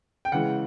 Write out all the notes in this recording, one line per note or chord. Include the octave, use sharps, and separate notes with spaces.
G5
C#3 E3 G#3 F#5